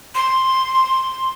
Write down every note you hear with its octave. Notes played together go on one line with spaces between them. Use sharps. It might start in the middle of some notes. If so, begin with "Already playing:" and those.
C6